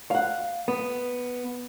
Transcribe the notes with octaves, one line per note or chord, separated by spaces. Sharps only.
F5 F#5
B3